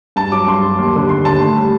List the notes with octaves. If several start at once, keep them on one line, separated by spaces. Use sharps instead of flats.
G2 A5
F#3 D6
G2 C6
F#3
D#2
D3 G3
D#2 C6
D3 G3 A5
A2
G3